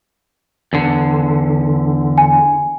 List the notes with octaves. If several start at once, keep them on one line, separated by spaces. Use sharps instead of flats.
E2 D3
G#5